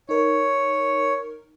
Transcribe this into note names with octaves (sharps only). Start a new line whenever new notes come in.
D#4 A#4 C#5